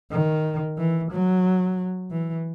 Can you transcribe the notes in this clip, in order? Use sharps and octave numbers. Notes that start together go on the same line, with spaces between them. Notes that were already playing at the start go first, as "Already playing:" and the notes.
D#3
E3
F#3
E3